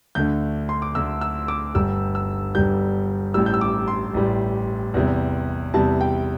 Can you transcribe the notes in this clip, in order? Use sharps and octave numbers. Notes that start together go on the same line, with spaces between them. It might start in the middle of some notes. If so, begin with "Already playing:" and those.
D2 D3 A3 G6
C6
D6
D2 D3 A3 E6
E6
D6
G1 G2 G3 E6
E6
G1 G2 G3 G6
A1 A2 G3 E6
G6
E6
D6
C6
A1 A2 G3
E2 C3 G3
E2 C3 G3 A5
G5